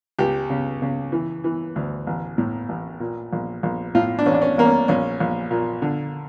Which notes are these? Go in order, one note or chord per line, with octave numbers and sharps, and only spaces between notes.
C#2 G4
C#3
C#3
E3
E3
D2
A1
A2
A1
A#2
A#1
A#1
A2 F4
D4
A1 C#4
D4
C#4
A1 A#3
C#4
A#1 C#4
A#1
A#2
D3